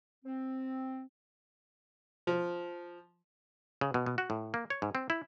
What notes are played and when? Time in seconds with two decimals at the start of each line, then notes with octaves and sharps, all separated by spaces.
0.24 C4
2.27 F3
3.81 C#3
3.94 B2
4.06 B2
4.18 F#4
4.30 A2
4.54 A#3
4.70 C#5
4.82 G#2
4.95 C4
5.10 E4